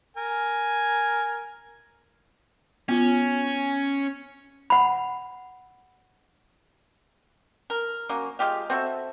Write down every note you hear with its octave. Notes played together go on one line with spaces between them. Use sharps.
A#4 G#5
B3 C#4 F4
F#5 B5
A#4
F#3 A#3 C#4
G#3 F4 G4 F5
C4 F#4 A4 E5